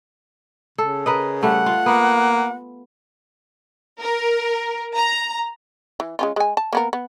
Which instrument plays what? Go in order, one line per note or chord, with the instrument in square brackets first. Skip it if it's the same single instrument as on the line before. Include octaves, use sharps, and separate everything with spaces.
[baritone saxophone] C#3 [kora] A4
[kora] A#4 B4 D#5
[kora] G3 A3 [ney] F#5
[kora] F4
[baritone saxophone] A#3 [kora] B3
[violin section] A#4
A#5
[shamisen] E3
G#3 C#4 F4
G#3 G#5
A5
A#3 B3 A#4
B3